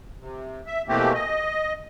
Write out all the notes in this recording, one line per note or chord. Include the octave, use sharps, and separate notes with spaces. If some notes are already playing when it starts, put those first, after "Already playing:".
C3
E5
B2 E3 A3 A#3 C4 G4
D#5